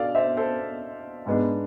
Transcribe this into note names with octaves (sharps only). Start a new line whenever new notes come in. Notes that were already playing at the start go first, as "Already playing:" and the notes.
Already playing: B2 D4 A4 D5 F5
C5 E5
A4 C5
G#2 G#3 B3 D4